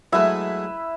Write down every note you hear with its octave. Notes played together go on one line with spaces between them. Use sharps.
F#3 G#3 A3 E4 B4 E5